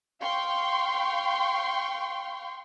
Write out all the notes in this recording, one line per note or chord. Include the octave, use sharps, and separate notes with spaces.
F5 G5 C6 C#6